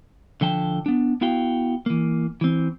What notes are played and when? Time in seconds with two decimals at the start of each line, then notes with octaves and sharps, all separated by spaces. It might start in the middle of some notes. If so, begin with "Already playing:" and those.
0.41 D3 F3 G5 A5
0.86 B3 D4
1.21 B3 E4 F#4 F5 G5
1.86 E3 A#3
2.41 E3 C4